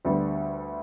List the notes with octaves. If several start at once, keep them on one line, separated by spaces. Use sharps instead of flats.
D2 D3 G3 B3